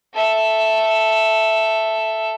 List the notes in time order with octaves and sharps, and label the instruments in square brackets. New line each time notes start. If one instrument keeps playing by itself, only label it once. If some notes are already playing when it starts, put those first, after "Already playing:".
[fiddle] A4 E5